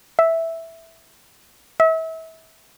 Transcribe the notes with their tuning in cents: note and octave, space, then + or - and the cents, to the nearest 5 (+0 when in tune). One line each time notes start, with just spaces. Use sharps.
E5 -5
E5 -35